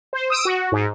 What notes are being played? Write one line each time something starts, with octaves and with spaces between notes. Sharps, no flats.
C5
D#6 E6 D7
F#4
G#2